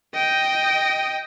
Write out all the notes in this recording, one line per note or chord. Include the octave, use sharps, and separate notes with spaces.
D#5 G5